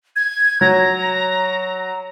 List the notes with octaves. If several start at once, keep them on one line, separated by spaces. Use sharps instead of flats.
G#6
F#3 A#5